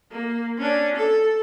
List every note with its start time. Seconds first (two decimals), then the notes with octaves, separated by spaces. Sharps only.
0.11 A#3
0.58 C#4 D4
0.96 A4